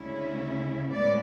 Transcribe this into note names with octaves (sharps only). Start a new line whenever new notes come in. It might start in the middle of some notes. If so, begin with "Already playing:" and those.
Already playing: D2 C#3 G#3 C#4 E4
A2 G#3 B3 D5